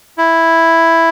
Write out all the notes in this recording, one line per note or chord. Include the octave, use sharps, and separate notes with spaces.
E4